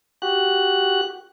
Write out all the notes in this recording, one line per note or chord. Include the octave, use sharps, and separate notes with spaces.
F#4 G4 F#6